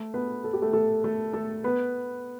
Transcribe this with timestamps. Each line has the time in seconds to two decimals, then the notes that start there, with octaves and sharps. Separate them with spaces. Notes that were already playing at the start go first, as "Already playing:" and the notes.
Already playing: A3 A4
0.14 B3 B4
0.44 A4
0.53 G4
0.62 A3 A4
0.73 A3 A4
1.04 A3 A4
1.33 A3 A4
1.64 B3 B4